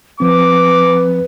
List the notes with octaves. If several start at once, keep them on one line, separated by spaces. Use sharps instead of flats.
F3 C4 B4 D6